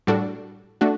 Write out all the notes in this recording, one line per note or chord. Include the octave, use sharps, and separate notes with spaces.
A2 G3 D4 F#4 A4
A3 D4 F#4